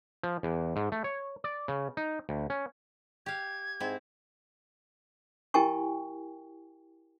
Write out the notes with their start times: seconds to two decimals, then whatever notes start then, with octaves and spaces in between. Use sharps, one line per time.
0.23 F3
0.43 E2
0.76 G#2
0.92 A3
1.04 C#5
1.44 D5
1.68 C#3
1.97 D#4
2.29 D2
2.50 C#4
3.26 G4 F5 G#6
3.80 G#2 C4 E4
5.54 E4 G4 A#4 G5 G#5 C#6